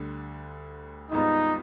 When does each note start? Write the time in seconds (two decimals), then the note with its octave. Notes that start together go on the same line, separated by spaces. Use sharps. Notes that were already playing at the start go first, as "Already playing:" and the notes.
Already playing: D2 D3 G3
1.11 G#1 G#2 G3 B3 D#4 F4